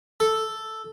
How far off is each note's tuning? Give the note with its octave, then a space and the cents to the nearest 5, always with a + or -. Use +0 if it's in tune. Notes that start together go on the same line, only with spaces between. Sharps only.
A4 +0